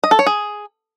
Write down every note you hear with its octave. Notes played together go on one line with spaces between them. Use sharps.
D#5
A4
C#5
G#4